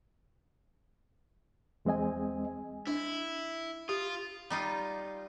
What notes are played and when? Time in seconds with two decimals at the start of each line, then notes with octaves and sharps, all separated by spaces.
1.85 E2 G#3 C4 D#5 G#5
2.87 D4 E4
3.89 F4 G4
4.50 G3 D#4 F4